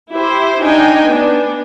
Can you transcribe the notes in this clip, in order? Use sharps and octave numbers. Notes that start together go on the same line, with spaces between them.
E4 G4 C5
D4 D#4 G5 G#5
B3 D4